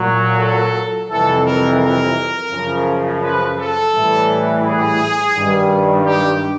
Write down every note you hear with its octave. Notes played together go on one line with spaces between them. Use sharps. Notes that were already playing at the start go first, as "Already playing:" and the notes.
Already playing: A#2 F#3
A4
F2 C3 E3 G3 A4
A#4
A#4
F#2 C#3 F3
B4
A4
A2 E3 G3
G#4
G2 D#3 G3
G4